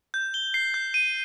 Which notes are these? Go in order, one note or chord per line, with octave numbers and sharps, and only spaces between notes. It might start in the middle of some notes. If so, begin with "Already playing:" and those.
G6
G7
C7
G6
D#7